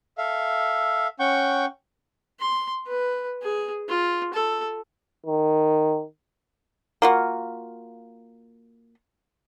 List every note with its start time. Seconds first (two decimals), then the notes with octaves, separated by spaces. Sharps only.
0.18 A4 E5 F5
1.20 C#4 F#5 G5 C#6 G6
2.39 C6
2.87 B4
3.42 G#4
3.88 F4
4.33 A4
5.26 D#3
7.02 A#3 F4 F#4